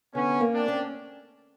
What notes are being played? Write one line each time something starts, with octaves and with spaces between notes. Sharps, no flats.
D3 B3 C#4
A#3
C4 D4
C#4